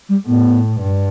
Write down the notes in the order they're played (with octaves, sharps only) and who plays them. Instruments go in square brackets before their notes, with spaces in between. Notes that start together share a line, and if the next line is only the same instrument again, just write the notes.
[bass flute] G3
[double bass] A2 [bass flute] B3
[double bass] G2